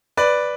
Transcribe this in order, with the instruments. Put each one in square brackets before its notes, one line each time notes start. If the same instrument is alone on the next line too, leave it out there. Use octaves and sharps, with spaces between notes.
[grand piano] B4 D5